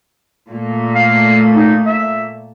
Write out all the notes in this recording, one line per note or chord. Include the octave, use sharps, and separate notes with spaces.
A#2 A3 A#3
F5
D#4
E5